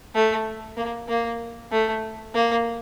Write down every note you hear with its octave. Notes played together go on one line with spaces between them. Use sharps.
A3
A#3
A#3
A3
A#3